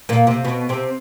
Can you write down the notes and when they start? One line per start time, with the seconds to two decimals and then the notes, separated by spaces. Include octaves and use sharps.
0.09 A#2 A#3
0.27 C3 C4
0.44 B2 B3
0.69 C3 C4